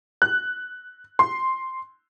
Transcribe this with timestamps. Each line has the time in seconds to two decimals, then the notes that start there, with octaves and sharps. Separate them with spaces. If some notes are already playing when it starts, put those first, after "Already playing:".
0.22 F#6
1.19 C6